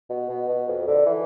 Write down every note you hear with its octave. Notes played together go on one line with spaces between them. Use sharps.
B2
B2
B2
F2
D3
E3